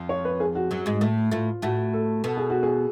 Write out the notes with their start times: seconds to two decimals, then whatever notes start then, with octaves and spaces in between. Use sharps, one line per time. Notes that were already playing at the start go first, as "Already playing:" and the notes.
Already playing: F2 F3
0.09 C#5
0.25 B4
0.40 G#4
0.55 F#4
0.71 F#2 F#3
0.86 G#2 G#3
1.01 A2 A3
1.31 A2 A3 F4
1.62 A2 A3 F#4
1.93 A4
2.24 B2 B3 A4
2.37 G#4
2.50 F#4
2.63 G#4